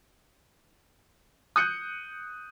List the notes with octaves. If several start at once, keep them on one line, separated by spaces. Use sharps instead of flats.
D#6 F#6 G6 C#7